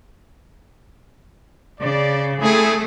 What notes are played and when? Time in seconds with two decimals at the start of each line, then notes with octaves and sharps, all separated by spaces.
1.80 C#3 D5
2.41 A3 C4 E4 G#4